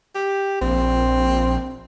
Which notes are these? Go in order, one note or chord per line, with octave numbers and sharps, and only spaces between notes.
G4
A#1 C4